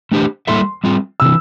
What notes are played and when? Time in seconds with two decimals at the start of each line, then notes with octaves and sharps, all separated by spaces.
0.12 A3 D4 G4 C5
0.47 G3 A#3 E4 A4 E5 C6
0.84 G3 C4 F4
1.20 C3 E3 E6